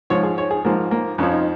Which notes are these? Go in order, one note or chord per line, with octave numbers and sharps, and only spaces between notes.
G#2 F3 C#5
G#4
C#5
G#4
G#2 F3 A#3
A#3
F2 F3 C#4
D#4